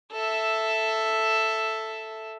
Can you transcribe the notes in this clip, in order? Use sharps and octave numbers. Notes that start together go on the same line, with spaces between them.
A4 E5